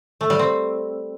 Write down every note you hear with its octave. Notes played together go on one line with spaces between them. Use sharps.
A3
G3
C4